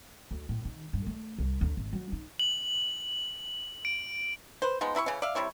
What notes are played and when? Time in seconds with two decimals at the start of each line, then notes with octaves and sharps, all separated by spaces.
0.31 D2
0.49 A2
0.65 D#3
0.93 G2
1.06 A3
1.39 C2
1.61 D2
1.77 G#1
1.93 F#3
2.12 D#4
2.39 F#7
3.85 D7
4.62 B4 C5
4.81 F3 G#3 B3 D#4
4.95 C3 E4 B5 C#6
5.06 C#3 E3 C#4
5.22 D5 E5 F5
5.35 C3 G3 E4 C#5